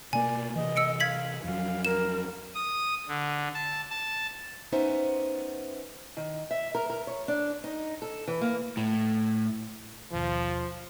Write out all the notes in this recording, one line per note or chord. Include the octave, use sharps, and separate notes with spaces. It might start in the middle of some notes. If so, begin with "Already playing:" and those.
B2 A#3 D5 G#5
C3 E3 D#5
E6 C#7 D7
F5 G#6 B6 F#7
F2 F#3 F5
A#4 E7
D#6
D3
A5
A5
B3 C#4 D#4 C5 E5
D#3
E5
A#4
A#4
C#5
D4
D#4
A4
E3
A#3
A2
G1 D#2 B2 F3